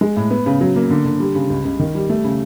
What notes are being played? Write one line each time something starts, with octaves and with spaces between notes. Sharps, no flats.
G#3
A2
B3
C#3
F#3
A#3
D3
D3
G3
C#3
C#2
C#2
D#3
G3
A3
C#3